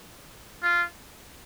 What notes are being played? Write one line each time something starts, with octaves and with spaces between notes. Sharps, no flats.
F4